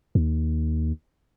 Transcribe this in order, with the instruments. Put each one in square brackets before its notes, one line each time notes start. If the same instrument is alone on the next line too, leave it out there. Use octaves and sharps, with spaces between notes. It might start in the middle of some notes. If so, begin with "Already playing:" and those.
[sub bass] D#2